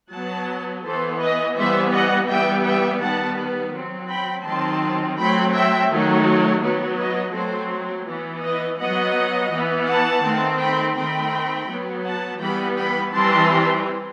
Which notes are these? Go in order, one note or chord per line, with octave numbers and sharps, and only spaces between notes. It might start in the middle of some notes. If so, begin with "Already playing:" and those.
F#3 B3 F#5 A5
E3 B3 A4 C5
B4 D#5
E3 G3 B3 C5 E5
D#5 F#5
E3 G3 B3 E5 G5
E5 G5
D#3 G3 B3 F#5 A5
F#3 C4
G5 B5
D#3 F#3 C4 A5 C6
F#3 A3 C4 G5 B5
E5 G5
D#3 F#3 A3
F#3 B3
B4 D#5
F#3 A3 C4 A4 C5
E3 B3
B4 D#5
F#3 B3 D#5 F#5
E3 B3
F#5 A5
D#3 A3 C4
G5 B5
D#3 A3 C4 G5 B5
F#3 B3
F#5 A5
E3 G3 B3 G5 B5
G5 B5
E3 G3 C4 A5 C6